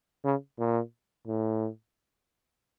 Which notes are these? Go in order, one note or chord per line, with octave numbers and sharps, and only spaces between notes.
C#3
A#2
A2